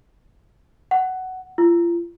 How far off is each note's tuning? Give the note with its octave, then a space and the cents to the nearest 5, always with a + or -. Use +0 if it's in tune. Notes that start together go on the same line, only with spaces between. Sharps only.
F#5 +10
F4 -35